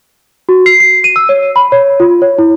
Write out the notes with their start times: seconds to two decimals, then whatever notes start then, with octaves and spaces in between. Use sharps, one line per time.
0.49 F#4
0.66 C7
0.80 C7
1.04 D#7
1.16 E6
1.29 C#5
1.56 B5
1.72 C#5
2.00 F4
2.22 C#5
2.38 E4